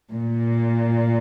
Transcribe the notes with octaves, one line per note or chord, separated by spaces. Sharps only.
A#2